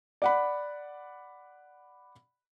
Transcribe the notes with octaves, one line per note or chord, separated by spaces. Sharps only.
D5 F#5 B5